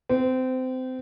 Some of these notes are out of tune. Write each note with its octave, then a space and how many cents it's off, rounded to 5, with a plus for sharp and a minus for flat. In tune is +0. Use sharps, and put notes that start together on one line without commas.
C4 -25